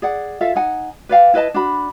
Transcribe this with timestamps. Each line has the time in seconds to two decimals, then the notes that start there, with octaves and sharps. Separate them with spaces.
0.02 G#4 D5 F#5
0.41 F4 A4 E5 F5
0.55 D#4 F#5 G#5
1.09 B4 D5 F5 G5
1.34 E4 B4 D#5 A5
1.54 D4 F#4 B5